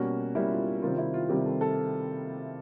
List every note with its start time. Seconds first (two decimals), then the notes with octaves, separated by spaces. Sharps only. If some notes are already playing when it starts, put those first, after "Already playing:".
Already playing: B2 G3 A#3 C#4 F#4
0.35 B2 G3 A#3 C#4 E4
0.51 F4
0.82 C3 D#3 G3 C4 F4
0.98 E4
1.14 F4
1.29 C3 D#3 G3 C4 G4
1.45 A4
1.61 A4